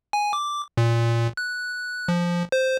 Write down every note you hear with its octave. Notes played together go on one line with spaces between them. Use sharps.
G#5
D6
A#2
F#6
F3
C5